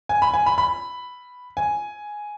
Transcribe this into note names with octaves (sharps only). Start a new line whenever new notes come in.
G#5
B5
G#5
B5
B5
G#5